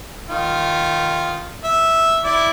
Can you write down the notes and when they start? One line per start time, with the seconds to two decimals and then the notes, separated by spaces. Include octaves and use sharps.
0.29 D#3 F4
1.64 E5
2.24 E4 D5